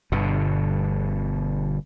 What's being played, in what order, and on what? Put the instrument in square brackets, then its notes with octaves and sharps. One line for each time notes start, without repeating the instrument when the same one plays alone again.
[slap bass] G1 G2 B2 D3